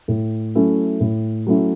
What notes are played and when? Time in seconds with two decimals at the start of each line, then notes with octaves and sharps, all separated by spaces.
0.08 A2
0.55 F#3 A3 C#4 E4
1.00 A2
1.47 F#3 A3 C#4 E4